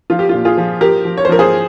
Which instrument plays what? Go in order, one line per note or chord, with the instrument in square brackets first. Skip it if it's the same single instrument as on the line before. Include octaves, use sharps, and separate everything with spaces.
[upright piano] F3 F4
G4
A#2 F4
F4 G#4
F3
F3 G4 A#4
F3
C#5
C5
F3 A#4
G#4 C5